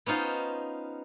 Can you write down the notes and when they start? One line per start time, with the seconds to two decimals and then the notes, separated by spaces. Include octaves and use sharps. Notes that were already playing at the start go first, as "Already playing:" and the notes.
0.06 B3 C#4 D#4 F4 C5